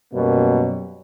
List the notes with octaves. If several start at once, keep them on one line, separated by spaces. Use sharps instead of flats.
F#2 B2 G3 A#3 C#4